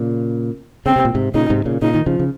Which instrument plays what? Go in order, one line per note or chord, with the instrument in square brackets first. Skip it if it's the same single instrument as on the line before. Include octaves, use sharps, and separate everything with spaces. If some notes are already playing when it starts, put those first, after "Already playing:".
Already playing: [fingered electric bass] A#2 C#3
[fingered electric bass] C#3 [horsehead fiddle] C4
[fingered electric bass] C3
A#2
G#2 C3
[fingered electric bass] A#2 C#3 [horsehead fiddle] D#4
[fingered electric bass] G#2 C3
A#2 C#3
[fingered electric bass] A#2 C#3 [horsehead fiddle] D#4
[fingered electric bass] D#3
C#3 F3
C#3